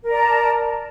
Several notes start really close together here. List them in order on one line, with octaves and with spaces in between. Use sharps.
A#4 D5 A#5 A5